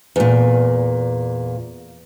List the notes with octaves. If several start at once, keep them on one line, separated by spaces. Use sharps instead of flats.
E2 A#2